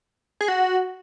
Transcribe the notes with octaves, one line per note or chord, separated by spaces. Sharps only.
G#4
F#4